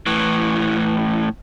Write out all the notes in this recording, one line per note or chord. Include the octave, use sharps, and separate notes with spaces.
A2 E3